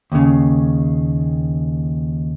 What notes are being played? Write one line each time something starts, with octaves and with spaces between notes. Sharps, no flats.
D#2 C#3